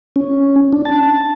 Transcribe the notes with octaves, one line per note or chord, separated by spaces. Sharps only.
C#4
D4
A5